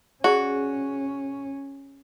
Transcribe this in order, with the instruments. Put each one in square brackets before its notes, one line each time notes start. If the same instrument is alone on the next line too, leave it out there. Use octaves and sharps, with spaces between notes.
[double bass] C#4 [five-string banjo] F#4 [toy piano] G#4 D5